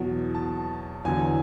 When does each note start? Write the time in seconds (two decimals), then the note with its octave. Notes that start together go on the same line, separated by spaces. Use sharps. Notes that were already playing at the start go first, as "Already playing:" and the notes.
Already playing: E2 B2 F#3
0.34 A5
1.05 E2 D3 F#3 G#5